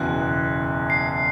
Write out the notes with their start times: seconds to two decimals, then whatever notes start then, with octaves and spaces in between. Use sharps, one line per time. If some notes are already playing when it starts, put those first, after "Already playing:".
Already playing: F#1 E2 B2 F#6
0.90 C7